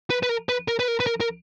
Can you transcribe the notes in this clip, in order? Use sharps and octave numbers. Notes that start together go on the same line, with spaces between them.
B4
B4
A#4
B4
A#4
B4
A#4
B4
A#4
A#4